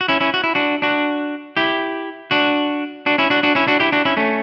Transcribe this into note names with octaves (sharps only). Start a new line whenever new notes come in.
F#4
C#4 E4
C#4 E4
F#4
E4
D4 F#4
D4 F#4
E4 G4
D4 F#4
D4 F#4
C#4 E4
D4 F#4
D4 F#4
C#4 E4
D4 F#4
E4 G4
D4 F#4
C#4 E4
A3 C#4